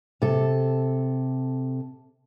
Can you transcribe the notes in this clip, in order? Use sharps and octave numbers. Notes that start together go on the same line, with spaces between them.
C3 A4